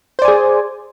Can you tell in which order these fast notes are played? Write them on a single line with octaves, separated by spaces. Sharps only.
C5 D5 G#5 G#4